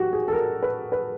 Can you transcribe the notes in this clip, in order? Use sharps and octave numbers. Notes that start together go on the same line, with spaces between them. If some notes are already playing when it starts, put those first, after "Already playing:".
Already playing: F#4 G4
G#4
A4
A#4
B4
B4